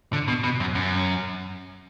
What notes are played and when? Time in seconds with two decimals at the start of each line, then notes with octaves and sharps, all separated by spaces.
0.13 D3
0.28 B2
0.43 B2
0.60 F#2
0.75 F#2